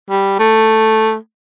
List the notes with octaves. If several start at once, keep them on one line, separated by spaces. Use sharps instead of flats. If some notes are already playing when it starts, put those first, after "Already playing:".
G3
A3